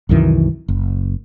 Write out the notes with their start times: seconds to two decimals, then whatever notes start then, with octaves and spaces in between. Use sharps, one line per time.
0.09 C2 F#2 D#3 E3
0.68 F#1